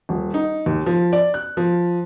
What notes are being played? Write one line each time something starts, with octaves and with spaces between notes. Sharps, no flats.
D#1
D#4
D#2
F3
D5
F#6
F3